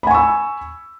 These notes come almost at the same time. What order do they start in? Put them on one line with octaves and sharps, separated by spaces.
B5 G#5 C#6 E6